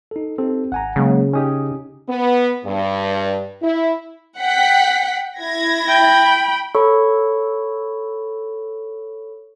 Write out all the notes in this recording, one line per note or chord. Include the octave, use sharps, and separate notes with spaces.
D#4 A4
C4 D#4 G4 A4
G#1 F#5 G#5 A#5
C#3 F#3 G#3 A#3
C#4 D#4 G4 G#5 D#6
B3
G2
E4
F#5 G5 B6
E4 G#6 A#6
G5 B5
A4 C#5 B5 C#6